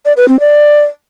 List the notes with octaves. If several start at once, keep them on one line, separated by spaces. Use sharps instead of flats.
D5
B4
C4
D5